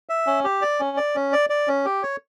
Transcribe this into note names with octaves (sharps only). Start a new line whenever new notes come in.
E5
C#4
G4
D5
C#4
D5
C#4
D5
D5
C#4
G4
C#5